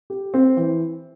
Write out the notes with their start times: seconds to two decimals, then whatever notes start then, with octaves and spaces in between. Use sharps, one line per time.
0.10 G4
0.34 C4
0.57 E3